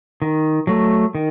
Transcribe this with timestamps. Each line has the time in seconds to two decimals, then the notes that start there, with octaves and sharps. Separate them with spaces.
0.22 D#3
0.67 F#3 A3
1.15 D#3